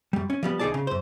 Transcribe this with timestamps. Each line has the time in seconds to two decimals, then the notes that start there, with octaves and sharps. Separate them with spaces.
0.13 F#2 G3
0.30 C#4
0.43 F3 G3 B3
0.59 C2 D#3 D#4 G#4 D5 A5
0.74 C#3
0.87 F#2 C5